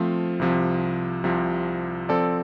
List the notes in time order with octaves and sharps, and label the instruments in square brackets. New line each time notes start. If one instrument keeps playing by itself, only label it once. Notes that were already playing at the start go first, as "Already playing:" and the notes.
Already playing: [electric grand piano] F3 A3 C4 F4
C2 C3 F3
C2 C3 F3
F3 C4 A4 D5